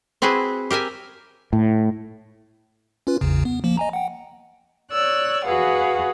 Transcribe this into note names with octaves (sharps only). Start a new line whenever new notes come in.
C4 E4 F#4 G#4 B4
G4 A#4 E5 G#5
A2
C#4 F4 B4
A1 E2 C#3
B3
F3 A#3
D#5 G#5 A#5
F#5 G5
C#5 D5 E6 F#6
F#4 G#4 B4 F5 F#5